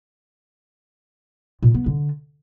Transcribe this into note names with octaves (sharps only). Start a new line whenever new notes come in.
A#2
B3
D3